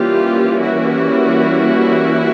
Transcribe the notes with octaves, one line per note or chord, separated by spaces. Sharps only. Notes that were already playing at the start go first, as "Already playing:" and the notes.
Already playing: E3 G3 A#3 C#4 F4 G4
E4 F#4